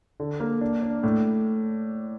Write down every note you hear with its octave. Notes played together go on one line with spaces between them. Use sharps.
D3
A#3
D4
D4
A2